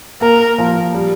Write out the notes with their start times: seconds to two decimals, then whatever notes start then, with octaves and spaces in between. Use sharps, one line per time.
0.21 A#3 A#4
0.58 F3
0.94 G3